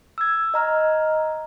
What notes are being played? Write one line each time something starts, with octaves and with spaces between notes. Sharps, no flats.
E6 G#6
D#5 A#5 F6